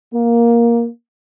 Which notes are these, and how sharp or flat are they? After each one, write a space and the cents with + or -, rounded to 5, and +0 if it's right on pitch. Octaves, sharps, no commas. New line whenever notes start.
A#3 +10